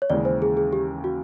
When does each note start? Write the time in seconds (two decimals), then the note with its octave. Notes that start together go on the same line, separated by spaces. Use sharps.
0.02 C#5
0.10 D#2 C#3 E3 G#3 D5
0.25 C5
0.42 G#4
0.57 G#4
0.73 G4
1.04 F#4